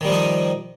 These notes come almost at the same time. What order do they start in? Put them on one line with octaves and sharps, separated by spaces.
D#3 G3 F3 D#4